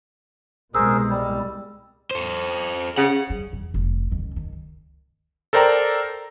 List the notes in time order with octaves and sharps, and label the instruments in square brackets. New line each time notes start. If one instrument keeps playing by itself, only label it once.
[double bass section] C2 B2 G#3 [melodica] G#4 A#4 C5 [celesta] E6
[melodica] G3
[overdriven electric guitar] A4 C5
[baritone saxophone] C#3 [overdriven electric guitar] F#5
[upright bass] G3
E2
F1
C#2 D#3
D#3
[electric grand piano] A4 A#4 C5 D5 G5 A#5